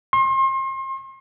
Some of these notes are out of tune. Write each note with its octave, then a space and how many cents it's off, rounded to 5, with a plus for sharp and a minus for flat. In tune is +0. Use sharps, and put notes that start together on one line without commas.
C6 +35